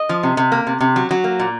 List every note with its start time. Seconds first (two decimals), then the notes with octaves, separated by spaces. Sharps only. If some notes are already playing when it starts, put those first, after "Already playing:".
Already playing: D#5
0.09 F3
0.23 C3
0.37 C3
0.52 A#3
0.67 C3
0.81 C3
0.96 F#3
1.11 F#3
1.24 A#3
1.40 A#2